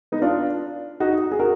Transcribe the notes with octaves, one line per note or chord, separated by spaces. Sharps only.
B3 D#4
D4 F4
D#4 F#4
G#4
F#4 A#4